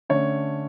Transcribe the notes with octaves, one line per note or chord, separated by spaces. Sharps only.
D3 A3 C#4 C#5